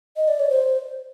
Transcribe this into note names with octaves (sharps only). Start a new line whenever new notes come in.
D#5
D5
C#5
C5